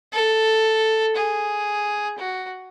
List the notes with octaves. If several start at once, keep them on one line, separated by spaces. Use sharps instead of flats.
A4
G#4
F#4